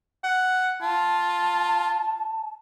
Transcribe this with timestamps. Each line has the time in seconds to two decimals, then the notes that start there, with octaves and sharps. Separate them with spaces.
0.24 F#5
0.82 F4 A5